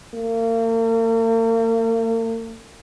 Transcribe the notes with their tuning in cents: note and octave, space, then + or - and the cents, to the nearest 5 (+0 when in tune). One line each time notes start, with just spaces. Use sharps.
A#3 -40